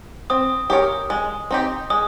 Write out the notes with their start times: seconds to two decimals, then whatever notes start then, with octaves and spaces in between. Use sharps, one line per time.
0.30 C4 D#6
0.70 G4 A#4 C#5
1.10 G#3
1.51 C4 D#4 G4
1.90 G#3 D#6